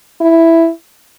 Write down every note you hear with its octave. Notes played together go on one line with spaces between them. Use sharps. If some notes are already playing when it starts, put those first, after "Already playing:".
E4